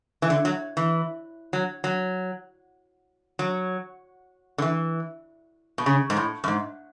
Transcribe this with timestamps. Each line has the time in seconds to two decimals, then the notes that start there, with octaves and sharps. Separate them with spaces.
0.22 E3
0.30 D3
0.45 F#3
0.77 E3
1.53 F#3
1.84 F#3
3.39 F#3
4.58 D3
4.62 E3
5.78 B2
5.86 C#3
6.10 G#2
6.17 A2
6.44 F#2
6.48 G#2